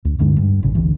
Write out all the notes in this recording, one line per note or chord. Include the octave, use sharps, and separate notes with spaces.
D2
D1 G2 D3 G#3
G2
A1 C#3
G#1 D2 E3